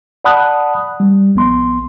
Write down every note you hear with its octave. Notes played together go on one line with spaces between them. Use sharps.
D5 F#5 A5 B5 D#6 F#6
G3
A#1 B3 C6